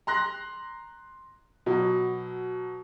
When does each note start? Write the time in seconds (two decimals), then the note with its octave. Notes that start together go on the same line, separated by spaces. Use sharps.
0.07 A#5 C6 F#6 A#6
1.66 B2 F#3